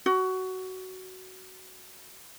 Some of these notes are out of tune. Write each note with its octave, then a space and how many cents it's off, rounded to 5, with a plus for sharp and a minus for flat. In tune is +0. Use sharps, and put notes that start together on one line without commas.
F#4 +15